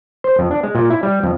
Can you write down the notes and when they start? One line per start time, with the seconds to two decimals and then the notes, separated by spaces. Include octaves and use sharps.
0.24 C5
0.39 F2
0.51 D4
0.63 G#3
0.75 A#2
0.90 E4
1.03 G3
1.24 F2